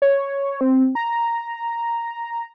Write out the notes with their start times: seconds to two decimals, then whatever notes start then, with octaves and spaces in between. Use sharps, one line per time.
0.02 C#5
0.61 C4
0.95 A#5